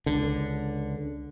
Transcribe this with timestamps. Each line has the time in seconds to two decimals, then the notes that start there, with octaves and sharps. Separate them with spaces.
0.06 C#2 D3